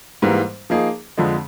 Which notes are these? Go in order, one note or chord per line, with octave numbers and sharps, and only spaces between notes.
G#2 E3 G3 A#3
F3 A#3 D#4 G#4
F2 D3 F3 G#3